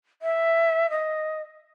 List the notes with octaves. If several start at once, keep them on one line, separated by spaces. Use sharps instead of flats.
E5
D#5